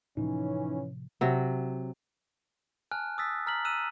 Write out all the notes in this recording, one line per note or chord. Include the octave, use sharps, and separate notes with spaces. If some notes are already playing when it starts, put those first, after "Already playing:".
A2 C3 E3 F3 C#4 D#4
C3 F#3
G#5 A5 F6 F#6
D#6 E6 A6 B6
A#5 F6 B6 F#7
E6 F#6 D#7 E7